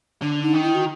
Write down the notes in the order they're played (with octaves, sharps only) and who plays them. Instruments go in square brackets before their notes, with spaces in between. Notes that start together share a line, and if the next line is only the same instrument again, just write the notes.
[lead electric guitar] D3 [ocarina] D4
[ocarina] D#4
[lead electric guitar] D#3
[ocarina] E4
F#4